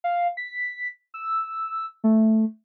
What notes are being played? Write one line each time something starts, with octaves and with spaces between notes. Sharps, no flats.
F5
B6
E6
A3